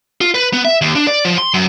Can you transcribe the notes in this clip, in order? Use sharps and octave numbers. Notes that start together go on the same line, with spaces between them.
F4
B4
B3
E5
D#2
D4
D5
F3
C6
F#2